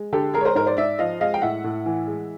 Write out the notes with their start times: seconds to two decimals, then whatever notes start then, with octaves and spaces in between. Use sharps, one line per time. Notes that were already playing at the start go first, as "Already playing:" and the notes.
Already playing: G#3
0.13 D3 G4 A4
0.34 G#3 G#4 A#4
0.41 C#5
0.45 A#4 C5
0.55 G#2 A#4 C5
0.67 C5 D5
0.77 G#2 D5 E5
0.99 F3 D#5 F5
1.20 G#3 D#5 F5
1.34 G5
1.42 A2 E5 F#5
1.64 A2
1.86 E3
2.07 G#3